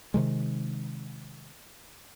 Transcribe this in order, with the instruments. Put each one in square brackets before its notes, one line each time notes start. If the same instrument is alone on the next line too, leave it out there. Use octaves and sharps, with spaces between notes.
[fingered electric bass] C3 D#3 G#3